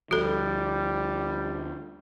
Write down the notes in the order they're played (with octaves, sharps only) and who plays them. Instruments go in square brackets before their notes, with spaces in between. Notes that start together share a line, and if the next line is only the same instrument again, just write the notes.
[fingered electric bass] D2 F3 [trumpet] G3 [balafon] F#4 A4